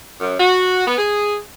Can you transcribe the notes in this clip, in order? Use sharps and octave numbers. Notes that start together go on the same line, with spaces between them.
F#2
F#4
B3
G#4